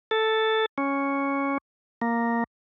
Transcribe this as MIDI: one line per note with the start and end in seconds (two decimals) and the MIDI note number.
0.11 0.66 69
0.78 1.58 61
2.01 2.44 58